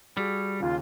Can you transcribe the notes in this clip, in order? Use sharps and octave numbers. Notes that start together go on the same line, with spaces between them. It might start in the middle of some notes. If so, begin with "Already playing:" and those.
G3 F#4 G#4
D#2 C#3 F4